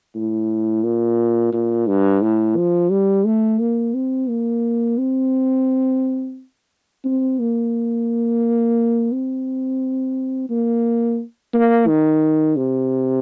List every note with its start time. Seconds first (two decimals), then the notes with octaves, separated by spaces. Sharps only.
0.15 A2
0.84 A#2
1.53 A#2
1.87 G2
2.22 A2
2.56 F3
2.91 G3
3.26 A3
3.60 A#3
3.94 C4
4.29 A#3
4.98 C4
7.05 C4
7.39 A#3
9.12 C4
10.49 A#3
11.54 A#3
11.87 D#3
12.56 C3